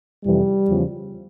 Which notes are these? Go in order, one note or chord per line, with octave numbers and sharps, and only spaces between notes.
F2 C3 E3 G3
E2 C#3 F3